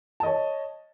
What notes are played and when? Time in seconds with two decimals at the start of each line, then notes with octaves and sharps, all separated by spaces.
0.20 A5
0.23 D#5
0.26 C#5